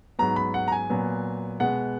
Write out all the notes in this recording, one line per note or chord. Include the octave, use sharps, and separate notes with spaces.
G#2 F#3 B3 A#5
B5
F#5
A#5
G#5
A#2 F#3 B3
B2 G#3 B3 F#5